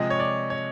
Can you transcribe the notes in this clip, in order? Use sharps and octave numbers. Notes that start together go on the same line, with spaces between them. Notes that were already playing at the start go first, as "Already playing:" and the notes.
Already playing: C3 F3 G#3 D#5
C#5
D5
C#5